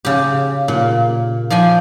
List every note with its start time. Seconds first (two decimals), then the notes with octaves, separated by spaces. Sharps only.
0.05 C#3 G4
0.68 A#2
1.50 F3 D5 G5 G#5